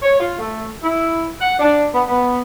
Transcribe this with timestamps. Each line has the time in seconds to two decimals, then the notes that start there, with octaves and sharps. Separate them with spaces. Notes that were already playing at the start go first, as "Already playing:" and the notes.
0.02 C#5
0.19 F4
0.39 A3
0.82 E4
1.40 F#5
1.60 D4
1.92 B3
2.07 B3